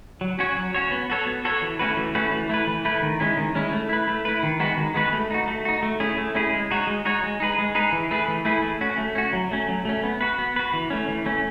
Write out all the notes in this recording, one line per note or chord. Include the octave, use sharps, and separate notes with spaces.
F#3
C#4 F#4 C#5
F#3
C#4 F#4 C#5
B3
F#4 A4 C#5
B3
F#4 A4 C#5
E3
A3 C#4 F#4 B4
E3
A3 C#4 F#4 B4
E3
A3 E4 B4
E3
A3 E4 B4
D#3
G#3 C#4 E4
D#3
G#3 C#4 E4
A3
E4 B4
A3
E4 B4
D#3
G#3 B3 F#4 B4
D#3
G#3 B3 F#4 B4
A3
D#4 F#4
A3
D#4 F#4
A3
C#4 E4 G#4
A3
C#4 E4 G#4
G#3
D#4 F#4 C#5
G#3
D#4 F#4 C#5
G#3
D#4 G#4 B4
G#3
D#4 G#4 B4
E3
A3 E4 G#4 B4
E3
A3 E4 G#4 B4
A3
C#4 F#4
A3
C#4 F#4
F#3
A3 C#4
F#3
A3 C#4
B3
F#4 B4
B3
F#4 B4
E3
A3 C#4
E3
A3 C#4